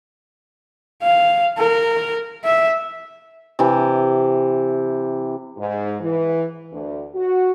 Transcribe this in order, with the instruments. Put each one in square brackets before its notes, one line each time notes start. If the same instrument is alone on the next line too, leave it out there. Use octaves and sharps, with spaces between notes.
[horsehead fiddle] F5
A#4
E5
[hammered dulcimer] C3 E3
[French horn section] G#2
E3
D2
F#4